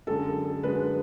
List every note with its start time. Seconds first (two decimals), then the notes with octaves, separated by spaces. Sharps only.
0.07 F#2 D3 G#3 A4
0.63 F#2 D3 G#3 B4